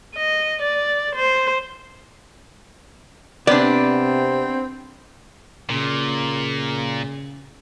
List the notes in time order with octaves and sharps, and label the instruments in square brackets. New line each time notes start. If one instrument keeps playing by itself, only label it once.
[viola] D#5
D5
C5
[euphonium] C3 [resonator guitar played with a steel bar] B3 D4 [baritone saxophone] C4 [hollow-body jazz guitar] D5
[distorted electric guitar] A#2 [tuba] C#3